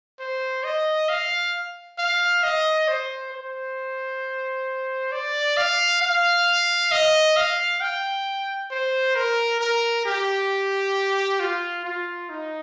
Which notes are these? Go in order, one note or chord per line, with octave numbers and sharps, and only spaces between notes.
C5
D#5
F5
F5
D#5
C5
C5
D5
F5
F5
D#5
F5
G5
C5
A#4
A#4
G4
F4
F4
D#4